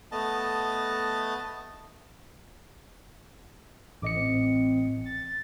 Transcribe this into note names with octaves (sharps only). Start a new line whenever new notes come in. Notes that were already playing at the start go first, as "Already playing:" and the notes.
A3 B3 D#5 A5
A1 D#5 D6 C#7
C4
A6